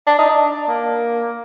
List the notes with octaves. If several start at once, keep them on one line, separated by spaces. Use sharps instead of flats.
D4
D#4
D4
A#3